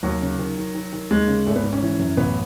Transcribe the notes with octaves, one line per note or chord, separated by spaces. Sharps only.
D#2 F#3
C#3
D#3
D#3
D#3
D#3
D#2 G#3
C#3
G#1 A3
B3
G#2
C#4
E3
F#2
A1 B3